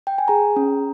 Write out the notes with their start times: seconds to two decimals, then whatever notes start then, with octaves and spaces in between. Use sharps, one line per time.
0.07 G5
0.18 G#5
0.28 G#4 A#5
0.56 C#4